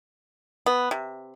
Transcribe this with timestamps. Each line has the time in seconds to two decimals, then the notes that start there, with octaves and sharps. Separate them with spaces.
0.66 B3
0.91 C3